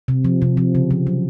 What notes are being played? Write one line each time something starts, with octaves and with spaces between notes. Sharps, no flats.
C3
F3
C3
F3
C#3
F3
F#3